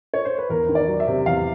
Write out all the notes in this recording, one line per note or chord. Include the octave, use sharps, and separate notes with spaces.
C#5
C5
B4
E2 A#4
D#3
D5
F#3
E5
C3
E2 F5